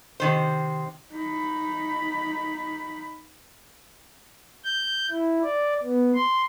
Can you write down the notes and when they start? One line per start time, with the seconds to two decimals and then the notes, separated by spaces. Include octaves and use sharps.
0.20 C3 D#3 C5
1.13 D#4 B5
4.64 G6
5.11 E4
5.44 D5
5.83 B3
6.15 C6